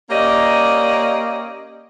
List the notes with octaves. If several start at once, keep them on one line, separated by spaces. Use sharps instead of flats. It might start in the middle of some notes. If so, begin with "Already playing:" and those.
A#3 C#4 G4 D5 D#5